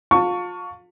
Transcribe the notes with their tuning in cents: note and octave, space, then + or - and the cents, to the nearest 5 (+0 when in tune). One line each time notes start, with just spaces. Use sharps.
F4 +30 A5 +30 C#6 +15